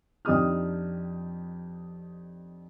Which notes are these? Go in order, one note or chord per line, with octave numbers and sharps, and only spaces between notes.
F2 D4 D#4 G4 D#6 F6